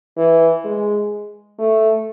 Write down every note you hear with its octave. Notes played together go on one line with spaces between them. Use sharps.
E3
G#3
A3